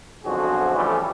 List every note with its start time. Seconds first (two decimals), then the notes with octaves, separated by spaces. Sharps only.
0.25 B1 F2 D3 F#4 G#4 C5
0.74 E3 F3 G3 A3 C#4 E4